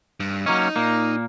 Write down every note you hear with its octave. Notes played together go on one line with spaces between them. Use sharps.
G2
F#3 A#3 C#4 D#4
A#2 A#3